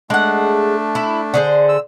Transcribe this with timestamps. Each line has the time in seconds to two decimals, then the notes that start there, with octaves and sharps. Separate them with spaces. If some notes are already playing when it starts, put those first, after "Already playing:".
0.10 G#3 A3 D4 F#5
0.95 E4
1.34 D3 G#4 C5
1.69 E6